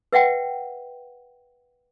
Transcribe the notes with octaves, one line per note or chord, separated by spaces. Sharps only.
B4 E5 F#5 G5